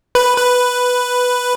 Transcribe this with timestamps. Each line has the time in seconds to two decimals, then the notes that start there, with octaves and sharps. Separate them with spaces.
0.15 B4
0.37 B4